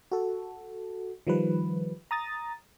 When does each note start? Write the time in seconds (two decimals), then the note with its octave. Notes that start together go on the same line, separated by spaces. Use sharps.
0.12 F#4 A4
1.27 D#3 F3 G3 B4
2.11 A#5 D#6 A6